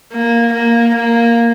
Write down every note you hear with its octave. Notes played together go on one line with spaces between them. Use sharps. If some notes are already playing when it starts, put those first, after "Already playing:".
A#3
A#3
A#3